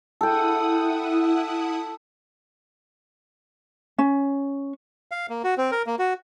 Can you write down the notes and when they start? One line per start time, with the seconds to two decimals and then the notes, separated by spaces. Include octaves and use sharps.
0.21 E4 A4 F#5 G5 D#6
3.98 C#4
5.11 F5
5.30 A#3
5.44 F#4
5.58 C4
5.71 A#4
5.86 A#3
5.99 F#4